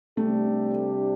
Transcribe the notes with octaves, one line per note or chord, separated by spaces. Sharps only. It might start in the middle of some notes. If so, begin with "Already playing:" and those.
C3 G3 A3 D4 G4